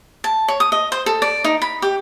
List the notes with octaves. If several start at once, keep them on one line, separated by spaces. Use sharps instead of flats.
A5
C#5
D#6
D#5
C5
A4
D5
D#4
B5
G4